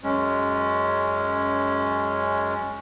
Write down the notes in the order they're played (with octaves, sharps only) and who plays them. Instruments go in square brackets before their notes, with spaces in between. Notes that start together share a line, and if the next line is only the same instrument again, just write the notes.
[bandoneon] F#2 G#3 C#4